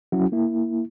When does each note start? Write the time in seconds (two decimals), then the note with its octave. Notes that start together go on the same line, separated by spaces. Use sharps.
0.12 F#3 C#4 E4 F#4
0.32 A#3 E4